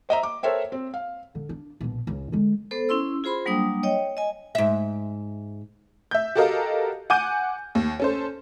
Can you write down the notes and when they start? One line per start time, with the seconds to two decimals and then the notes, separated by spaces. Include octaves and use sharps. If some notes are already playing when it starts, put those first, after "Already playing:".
0.09 C5 D#5 E5 A#5
0.23 D6
0.43 A4 A#4 C5 C#5 E5 G5
0.72 C4
0.94 F5
1.35 D3
1.49 D4
1.81 A#1 B2
2.07 C#2 F4
2.32 D3 G#3
2.71 B3 A4 C5
2.89 C#4 E4 C6 E6
3.24 F4 G#4 C5 B5 C6
3.46 F#3 G3 A#3 D4 G5 D#6
3.83 C#5 D#5 G5
4.17 D#5 G#5
4.55 G#2 E5
6.11 E5 G6
6.35 F#4 G4 A4 A#4 D#5 F5
7.10 F#5 G#5 D6 G6 D#7
7.75 D#2
8.00 C#4 A4 C5